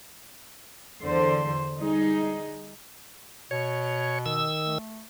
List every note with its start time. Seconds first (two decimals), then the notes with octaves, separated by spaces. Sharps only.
1.04 E2 D3 C5
1.78 G3 D#4 G#4
3.51 B2 C#5
4.26 D#3 E6
4.65 A3